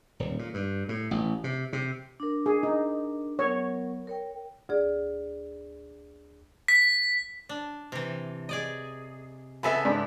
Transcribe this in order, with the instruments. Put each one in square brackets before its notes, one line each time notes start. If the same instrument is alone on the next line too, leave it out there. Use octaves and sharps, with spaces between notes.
[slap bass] D#1
A#2
G2
A2
A1
C3
C3
[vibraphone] D4 A#4
[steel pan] G#4
D#4
[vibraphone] F#3 B3 A#4 [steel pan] C#5
[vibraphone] A#4 C#5 G5
[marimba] D2 G#4 D5
[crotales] B6
[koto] D4
C3 E3
G#4 D5 D#5
[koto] C#3 B3 A4 [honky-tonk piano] E5 G#5 B5
[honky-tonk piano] G#2 D4